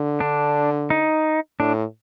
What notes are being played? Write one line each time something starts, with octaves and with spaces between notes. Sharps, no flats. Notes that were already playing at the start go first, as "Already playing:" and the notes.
Already playing: D3
D4
D#4
A2 D4